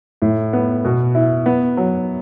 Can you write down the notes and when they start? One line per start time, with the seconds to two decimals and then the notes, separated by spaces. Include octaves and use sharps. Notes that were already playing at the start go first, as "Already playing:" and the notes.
0.22 A2
0.53 B3
0.85 B2
1.15 E4
1.46 B3
1.77 F#3